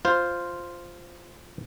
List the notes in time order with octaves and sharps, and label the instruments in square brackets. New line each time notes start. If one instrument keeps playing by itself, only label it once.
[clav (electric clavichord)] F4 C5